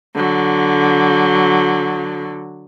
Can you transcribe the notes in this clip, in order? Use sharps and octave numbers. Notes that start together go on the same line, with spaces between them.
D3 F#3